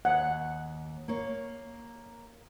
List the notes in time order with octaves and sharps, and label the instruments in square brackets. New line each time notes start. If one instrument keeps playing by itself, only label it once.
[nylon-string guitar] D#2 [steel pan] F#5
[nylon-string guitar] A#3 C#5